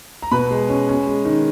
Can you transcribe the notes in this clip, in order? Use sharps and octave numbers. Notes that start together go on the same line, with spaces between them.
A#5
B2 B4 B5
G#3
C#4
C#4
G#3
D#3